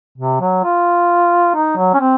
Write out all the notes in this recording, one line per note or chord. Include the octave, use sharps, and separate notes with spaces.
C3
F#3
F4
D#4
F#3
C#4
C4